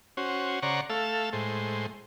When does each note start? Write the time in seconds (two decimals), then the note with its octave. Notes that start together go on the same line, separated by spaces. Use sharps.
0.17 C#4 F#4 C5
0.63 C#3 C5 D5 F#5 A#5 C#6
0.90 A3 A4 F5 E6
1.33 A2 G#3 C5